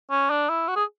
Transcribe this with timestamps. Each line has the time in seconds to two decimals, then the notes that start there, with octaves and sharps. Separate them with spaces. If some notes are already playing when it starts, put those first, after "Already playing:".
0.11 C#4
0.30 D4
0.49 E4
0.68 F#4
0.76 G#4